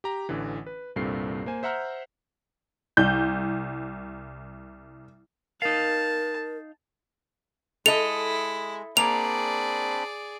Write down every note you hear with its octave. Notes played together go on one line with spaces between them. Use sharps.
G4 A#5
A1 D3 E3
B4
C2 G2 A#2 C4 A4 C7
A#3 C5 G#5
C5 E5 F#5 A#5 F6 G6
C2 G6
D#4 A#4 F5 A5
G#3 E4 A4 D#5 F7
A#3 C4 D4 G#4 D5 B5 F7